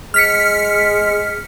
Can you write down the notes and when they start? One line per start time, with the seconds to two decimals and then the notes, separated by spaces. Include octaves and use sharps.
0.14 G#3 F6 B6 C#7